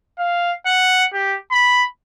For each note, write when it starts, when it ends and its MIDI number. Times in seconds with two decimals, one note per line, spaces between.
0.19 0.52 77
0.66 1.05 78
1.14 1.37 67
1.51 1.84 83